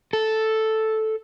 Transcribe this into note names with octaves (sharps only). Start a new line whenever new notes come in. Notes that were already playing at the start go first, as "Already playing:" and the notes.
A4